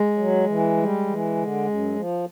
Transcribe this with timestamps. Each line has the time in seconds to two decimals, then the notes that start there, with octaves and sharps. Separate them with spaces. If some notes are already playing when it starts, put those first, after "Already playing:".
Already playing: G#3
0.18 F#3
0.47 E3
0.77 G3
1.07 E3
1.37 D3
1.66 F#2
1.96 F3